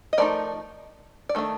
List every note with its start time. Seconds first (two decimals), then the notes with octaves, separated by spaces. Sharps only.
0.13 D#5
0.18 F3 A3 D#4 A#4 D5
1.29 D5
1.35 D#3 A3 D4